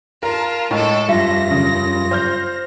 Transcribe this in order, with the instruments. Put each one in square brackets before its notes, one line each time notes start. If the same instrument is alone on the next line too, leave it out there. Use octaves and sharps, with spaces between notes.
[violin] F4 A5 [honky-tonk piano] A#4
[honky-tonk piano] A2 [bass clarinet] G#3 [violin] A4 A5
[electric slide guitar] F#2 G3 [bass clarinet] F4 [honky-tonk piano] E5 [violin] A#6
[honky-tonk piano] C#3
C5 F6 G6